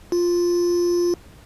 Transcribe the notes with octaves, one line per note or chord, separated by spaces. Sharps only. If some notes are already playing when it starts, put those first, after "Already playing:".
F4